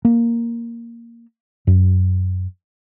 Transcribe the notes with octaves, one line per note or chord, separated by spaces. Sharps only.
A#3
F#2